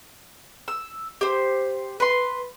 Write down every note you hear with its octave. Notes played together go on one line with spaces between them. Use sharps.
E6
G4 C5
B4 C6